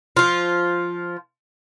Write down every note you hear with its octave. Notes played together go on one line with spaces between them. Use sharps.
F3 F4